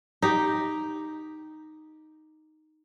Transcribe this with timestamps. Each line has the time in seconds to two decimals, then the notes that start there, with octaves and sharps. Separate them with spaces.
0.22 D#4 G4